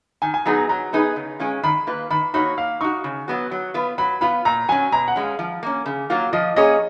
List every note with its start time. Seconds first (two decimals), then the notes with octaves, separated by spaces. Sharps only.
0.22 D#3 G#5
0.34 G#5
0.46 F#3 B3 D#4 G#4 A#5
0.57 A#5
0.69 F#3 A#5
0.93 B3 D#4 G#4 B4
1.16 C#3
1.40 G#3 C#4 F4
1.63 D#3 B5
1.87 A#3 F4 B4
2.10 D#3 B5
2.34 A#3 D#4 F#4 C#5 B5
2.57 A#3 F5
2.81 D#4 F#4 C#6
3.04 C#3
3.28 F#3 B3 F#4
3.51 F#3
3.74 B3 F4 B4
3.98 F#3 B5
4.21 B3 F4 B5
4.45 A#2 A#5
4.68 F#3 C#4 G#5
4.92 B2 A#5
5.08 F#5
5.16 G#3 C#4
5.23 F5
5.39 F3
5.63 A#3 C#4
5.86 C#3
6.10 F#3 A#3 F4
6.33 F3 D#5
6.56 A#3 C#4 G#4 C#5 D#5